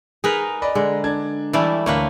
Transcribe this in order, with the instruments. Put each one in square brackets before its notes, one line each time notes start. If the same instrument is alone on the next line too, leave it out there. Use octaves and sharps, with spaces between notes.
[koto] D#4 A#4 B4 [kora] G#4
[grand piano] D5 D#5 B5
[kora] D3 G#3
[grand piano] D4 G#6
[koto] E3 G3 A3 [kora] E4 D5
[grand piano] D2 [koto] A3 A#3 B4 [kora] C#5